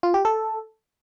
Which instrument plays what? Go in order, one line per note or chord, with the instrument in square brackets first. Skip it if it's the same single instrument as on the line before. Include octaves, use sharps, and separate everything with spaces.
[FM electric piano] F4
G4
A4